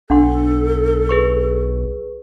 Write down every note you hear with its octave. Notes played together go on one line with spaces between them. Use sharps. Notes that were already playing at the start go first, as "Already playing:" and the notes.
B1 D4 A4 F#5 C6
G#4 B4 C#6